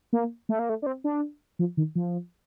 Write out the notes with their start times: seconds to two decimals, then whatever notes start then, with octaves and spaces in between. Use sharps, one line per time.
0.13 A#3
0.49 A3
0.59 A#3
0.69 A3
0.82 D4
0.86 C4
1.04 D4
1.59 F3
1.77 D#3
1.95 F3